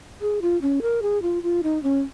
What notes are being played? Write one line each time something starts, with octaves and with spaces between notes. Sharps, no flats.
G#4
F4
C#4
A#4
G#4
F4
F4
D#4
C#4